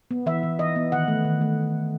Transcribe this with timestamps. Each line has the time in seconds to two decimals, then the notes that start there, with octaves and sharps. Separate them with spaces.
0.11 B3
0.26 E3 E5
0.43 E3
0.59 E3 D#5
0.76 B3
0.92 D#3 F#5
1.08 A3
1.25 D#3
1.41 A3